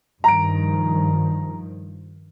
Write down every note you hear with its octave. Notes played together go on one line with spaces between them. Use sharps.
G2 D#3 F3 A#5 D7